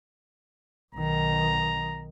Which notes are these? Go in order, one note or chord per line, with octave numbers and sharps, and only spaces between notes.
B1 D#3 A#5